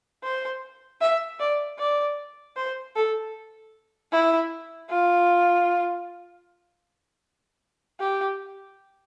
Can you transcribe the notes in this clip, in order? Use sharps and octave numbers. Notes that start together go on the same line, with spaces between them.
C5
E5
D5
D5
C5
A4
E4
F4
G4